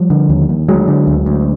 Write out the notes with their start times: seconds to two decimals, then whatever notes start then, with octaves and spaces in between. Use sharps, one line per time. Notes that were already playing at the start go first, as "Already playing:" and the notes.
Already playing: F3 G3
0.10 D3
0.29 D#2
0.49 D#2
0.68 D2 F#3 G#3
0.88 D3
1.07 D2
1.26 D2